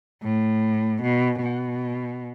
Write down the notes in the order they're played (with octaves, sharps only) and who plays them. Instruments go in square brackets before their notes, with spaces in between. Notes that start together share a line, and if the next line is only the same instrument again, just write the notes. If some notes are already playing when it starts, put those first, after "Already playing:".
[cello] A2
B2
B2